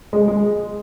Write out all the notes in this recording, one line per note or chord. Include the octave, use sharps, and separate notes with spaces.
G#3
G#3